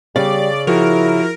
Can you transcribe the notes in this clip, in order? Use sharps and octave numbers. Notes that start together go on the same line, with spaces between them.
C#3 G3 D5
F3 E4 F#4 G#4 A#4